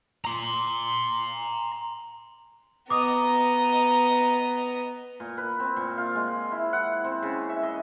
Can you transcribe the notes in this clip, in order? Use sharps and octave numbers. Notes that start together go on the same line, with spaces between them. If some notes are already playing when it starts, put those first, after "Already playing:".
A#5 C6
B3 D#5 A#5 D6 D#6
A#2
B4
C4
A#2
F4
G#3
E4
F#5
C4
C#3
E5
D#5